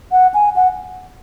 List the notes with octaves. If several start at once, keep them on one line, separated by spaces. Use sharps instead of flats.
F#5
G#5
F#5